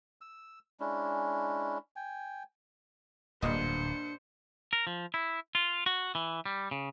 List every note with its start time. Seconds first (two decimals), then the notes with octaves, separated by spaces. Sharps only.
0.21 E6
0.80 G#3 C#4 D4 E4
1.96 G5 G#5
3.42 D1 G2 A#2 D4 C5 D#5 C#7
4.73 A#4
4.87 F3
5.14 E4
5.55 F4
5.86 F#4
6.15 E3
6.46 G3
6.71 C#3